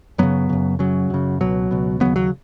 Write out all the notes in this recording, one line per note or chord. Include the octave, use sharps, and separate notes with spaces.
F#2 C#3 F#3 B3
F#2 C#3
F#2 C#3 F#3
F#2 C#3
C#2 B2 F#3
C#2 B2
D#2 C#3 F#3 B3
F#3